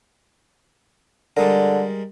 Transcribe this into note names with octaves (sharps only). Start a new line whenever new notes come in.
D3 G3 G#3 A#4